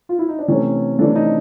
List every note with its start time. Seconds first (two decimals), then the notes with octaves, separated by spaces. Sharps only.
0.09 F4
0.19 E4
0.29 D#4
0.39 D4
0.48 C3 E3 A3 C#4
0.99 C3 E3 A3 D4
1.16 D#4